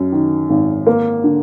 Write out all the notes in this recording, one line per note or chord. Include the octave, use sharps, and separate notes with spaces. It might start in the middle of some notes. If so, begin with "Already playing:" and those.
Already playing: F#2
D#3
G#1
A#3
D3